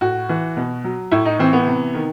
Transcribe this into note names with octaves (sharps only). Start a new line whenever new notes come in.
A2 F#4
E3
B2
F#3
A2 E4
D#4
E3 C4
B3
C3
D#3